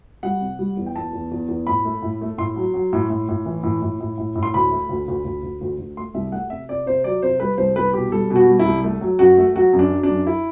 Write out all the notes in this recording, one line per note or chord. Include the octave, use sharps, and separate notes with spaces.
G3 F#5
C3
G3
E2
G5
E2 A5
E2
E2
E2
A2 B5
A3
A2
A3
A2 C6
F#3
F#3
A2
A2
A2
E3
A2
A2
A2
A2
A2
C6
D2 B5
A3
D2
D2
D2
D2
D2
D2
A3 C6
C2 E5
A3 F#5
C3 E5
C3 D5
C3 C5
F#3 D5
C3 C5
G3 B4
C2 C5
C2 B4
B2 G4
G3 A4
B2
F#4
G3
E4
C2
A3
F#3
F#2 F#4
A3
F#3 F#4
F#2
D4
F#3
D4
F#2
E4